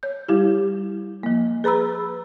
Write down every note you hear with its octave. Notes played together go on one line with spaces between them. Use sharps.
C#5 G6
G3 E4 G4
F3 A#3
G#4 B4 A#5 B5 E6